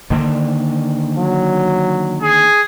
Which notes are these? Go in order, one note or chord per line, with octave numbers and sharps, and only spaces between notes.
D3 D#3 A#3
F#3
G#4